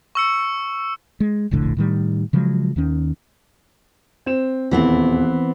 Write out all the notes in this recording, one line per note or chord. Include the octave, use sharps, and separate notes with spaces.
C#6 E6 C#7
G#3
E1 A#1 A2 D3
A2 D#3 G3
C#3 F3 F#3 G#3
D#2 D#3 C#4
C4 E7
D#1 E2 E3 B3 C4